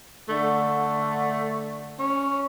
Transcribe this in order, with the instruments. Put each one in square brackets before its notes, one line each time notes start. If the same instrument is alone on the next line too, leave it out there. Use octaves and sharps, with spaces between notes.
[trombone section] D3 [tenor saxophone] A3
[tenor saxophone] C#4